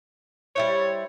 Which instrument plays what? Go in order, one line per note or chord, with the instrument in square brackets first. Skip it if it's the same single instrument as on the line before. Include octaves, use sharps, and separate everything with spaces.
[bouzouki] G3 E4 C5 [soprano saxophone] C#5